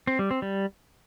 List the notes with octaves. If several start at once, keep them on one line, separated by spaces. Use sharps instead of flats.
C4
G3
C4
G3